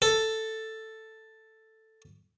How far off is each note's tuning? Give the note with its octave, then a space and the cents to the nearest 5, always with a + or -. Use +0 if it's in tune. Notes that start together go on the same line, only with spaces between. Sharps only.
A4 +5